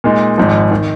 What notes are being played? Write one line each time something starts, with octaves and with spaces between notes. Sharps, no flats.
A#2 G#3 D#4
G#1 G#2 F3
D#3